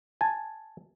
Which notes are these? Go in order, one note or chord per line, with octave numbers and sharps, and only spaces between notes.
G#5 A5